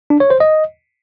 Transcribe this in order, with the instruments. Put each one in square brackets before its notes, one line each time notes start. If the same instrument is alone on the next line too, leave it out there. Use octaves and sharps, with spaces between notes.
[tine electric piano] D4
C#5
C5
D#5